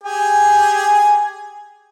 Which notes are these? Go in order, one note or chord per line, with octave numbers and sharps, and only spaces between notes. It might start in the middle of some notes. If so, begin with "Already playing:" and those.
G4 G#4 G#5